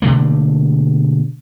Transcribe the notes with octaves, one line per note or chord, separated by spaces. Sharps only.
B2 D3 A3 A#3